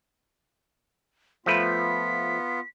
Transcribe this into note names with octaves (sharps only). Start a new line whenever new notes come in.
F3 A3 B3 F4 B4 B6